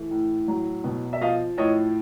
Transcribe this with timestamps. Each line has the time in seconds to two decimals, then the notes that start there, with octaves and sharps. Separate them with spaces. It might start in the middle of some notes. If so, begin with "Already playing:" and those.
Already playing: E3 A3
0.11 A2
0.48 F#3
0.84 B2
1.13 E5
1.21 F3 D#5 F5
1.57 A2 C#5 D#5